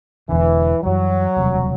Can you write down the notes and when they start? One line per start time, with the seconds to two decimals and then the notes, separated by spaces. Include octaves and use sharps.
0.29 E1 E2 D3 E3
0.83 F#2 E3 F#3 G3
1.36 E1 D2 C3 G3